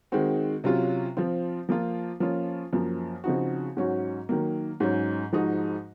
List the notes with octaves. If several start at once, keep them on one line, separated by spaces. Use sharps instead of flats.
D#3 G#3 C4 F#4
C3 F#3 C#4 F4
F3 C4 F4
F3 A#3 F4
F3 A#3 C#4 F4
F#2 F3 A#3
C#3 F3 C4 D#4 F#4
G#2 F#3 C#4 F#4
D#3 F#3 A#3
G#2 F#3 C#4
G#2 F3 G#3 D#4 F#4